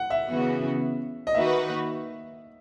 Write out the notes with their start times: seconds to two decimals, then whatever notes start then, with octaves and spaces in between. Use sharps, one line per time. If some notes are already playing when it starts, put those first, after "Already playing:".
Already playing: F#5
0.10 E5
0.28 C#3 E3 B3 F#4
1.27 D#5
1.35 D#3 A#3 D#4 F#4 B4 E5